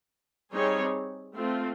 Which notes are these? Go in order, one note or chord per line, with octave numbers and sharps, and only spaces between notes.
G3 C4 D#4 G#4 C#5
A3 C4 F4